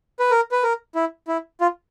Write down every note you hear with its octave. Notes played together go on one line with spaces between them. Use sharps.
B4
A#4
B4
A#4
E4
E4
F4